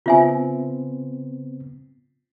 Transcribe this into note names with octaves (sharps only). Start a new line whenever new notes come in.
C#3 B3 C4 F4 E5 G#5